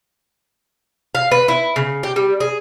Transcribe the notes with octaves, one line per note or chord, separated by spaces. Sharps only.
F5
B4
E4
C#3
G4
G3
G#4